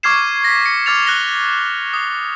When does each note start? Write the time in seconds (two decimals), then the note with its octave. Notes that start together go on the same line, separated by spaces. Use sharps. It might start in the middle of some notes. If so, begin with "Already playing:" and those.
0.03 C#6 D6 F6 G#6 C7 E7
0.44 A#6 B6
0.66 C#7
0.86 D6 F6 A6 F7
1.05 F#6 A#6 G7
1.93 D#6